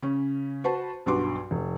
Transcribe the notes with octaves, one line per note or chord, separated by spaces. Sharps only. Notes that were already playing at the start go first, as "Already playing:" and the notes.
C#3 C#4
F#4 B4 C5 A5
B1 G2 F#4 B4 C6 D6
F1